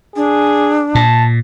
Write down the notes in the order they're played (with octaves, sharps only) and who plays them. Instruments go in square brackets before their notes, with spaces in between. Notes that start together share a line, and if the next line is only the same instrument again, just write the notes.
[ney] D4 [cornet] G#4
[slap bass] A#2 [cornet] A5